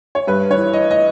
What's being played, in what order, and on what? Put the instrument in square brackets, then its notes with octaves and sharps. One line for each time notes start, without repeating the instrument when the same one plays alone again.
[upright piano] C#5
G2 B4
C#5
E3
D#5
D#5